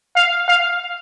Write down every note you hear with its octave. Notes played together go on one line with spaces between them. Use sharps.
F5
F5